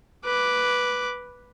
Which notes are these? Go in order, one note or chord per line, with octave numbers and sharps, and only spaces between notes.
B4 D6